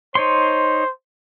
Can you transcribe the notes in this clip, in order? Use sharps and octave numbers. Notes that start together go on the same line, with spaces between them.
D#4 C5 C#5 C6